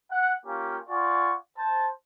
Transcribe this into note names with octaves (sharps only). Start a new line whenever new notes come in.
F#5
A#3 C#4 F4 G4
F4 D5 F#5 G#5 C#6
C5 A5